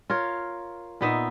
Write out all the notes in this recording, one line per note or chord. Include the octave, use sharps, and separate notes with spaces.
F4 A#4 C#5
A#2 B3 D#4 E5